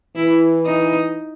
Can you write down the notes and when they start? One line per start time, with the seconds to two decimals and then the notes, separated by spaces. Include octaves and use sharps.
0.16 E3 E4
0.66 D#4